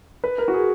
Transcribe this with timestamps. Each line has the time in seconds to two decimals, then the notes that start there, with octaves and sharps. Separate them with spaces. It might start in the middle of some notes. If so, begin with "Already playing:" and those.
0.24 B4
0.38 A#4
0.48 F#4
0.54 G#4